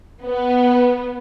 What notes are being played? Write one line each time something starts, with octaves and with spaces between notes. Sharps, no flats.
B3